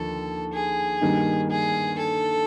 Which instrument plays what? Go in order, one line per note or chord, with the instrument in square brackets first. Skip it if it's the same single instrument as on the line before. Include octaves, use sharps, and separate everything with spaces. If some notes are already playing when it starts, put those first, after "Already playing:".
Already playing: [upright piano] D#2 D3 F3 [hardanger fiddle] A4
[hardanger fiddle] G#4
[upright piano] G2 D#3 G3 A#3 D#4
[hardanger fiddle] G#4
A4